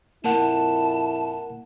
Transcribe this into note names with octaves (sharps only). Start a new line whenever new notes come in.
F2 A#2 A#3 E4 A#4 F#5 A5